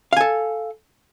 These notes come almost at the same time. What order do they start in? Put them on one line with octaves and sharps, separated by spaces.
F5 G#5 A4